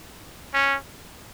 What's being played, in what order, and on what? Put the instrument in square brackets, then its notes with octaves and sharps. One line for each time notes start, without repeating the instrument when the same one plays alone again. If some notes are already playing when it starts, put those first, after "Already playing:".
[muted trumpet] C#4